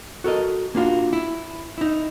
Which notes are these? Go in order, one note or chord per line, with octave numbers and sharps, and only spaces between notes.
F#4 A4 A#4 D#5
A#3 D4 F4 F#4
E4
D#4 E4